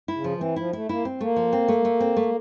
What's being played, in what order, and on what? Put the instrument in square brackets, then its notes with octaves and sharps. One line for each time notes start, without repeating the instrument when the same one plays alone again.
[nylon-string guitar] E4
[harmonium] C#3
[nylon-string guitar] F3
[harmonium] E3
[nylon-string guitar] C4
[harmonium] F3 [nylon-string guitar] E4
[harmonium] A3 [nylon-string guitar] E4
[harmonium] A#3 [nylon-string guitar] E4
[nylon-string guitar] C4
[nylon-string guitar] A3 [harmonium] A#3
[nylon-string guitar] F3
C4
A3
A3
C4
A3